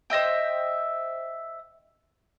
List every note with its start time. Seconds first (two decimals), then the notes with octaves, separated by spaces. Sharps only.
0.10 C5 D#5 E5 G5